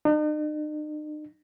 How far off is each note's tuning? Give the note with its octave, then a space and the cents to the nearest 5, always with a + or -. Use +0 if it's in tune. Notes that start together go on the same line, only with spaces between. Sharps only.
D#4 -45